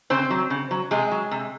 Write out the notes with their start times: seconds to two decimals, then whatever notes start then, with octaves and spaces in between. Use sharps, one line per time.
0.10 C#3 C4 C5
0.30 F#3
0.50 C#3
0.71 F#3
0.91 C3 G#3 G#4
1.11 F#3
1.31 C3